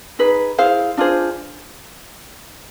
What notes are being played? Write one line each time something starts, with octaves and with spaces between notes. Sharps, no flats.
D#4 G#4 B4
E4 G#4 C5 F5
D4 F4 G#4 C5